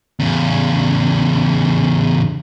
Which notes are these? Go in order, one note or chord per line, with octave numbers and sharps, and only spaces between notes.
E2 C#3